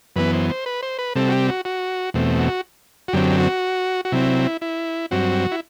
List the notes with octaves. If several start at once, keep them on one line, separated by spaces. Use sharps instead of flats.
F#2 E3 B3 B4
C5
C5
B4
C5
B4
C3 G3 C4 A4
F#4
G4
F#4
F#4
E2 B2 A3 C4
F#4
F#4
F#2 D3 F#3 C4 G4
F#4
F#4
C3 F#3 C4 E4
E4
G2 F#3 C4 F#4
E4